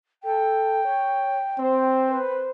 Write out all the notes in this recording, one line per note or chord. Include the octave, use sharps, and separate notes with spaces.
A4 G5
C#5
C4 C5
B4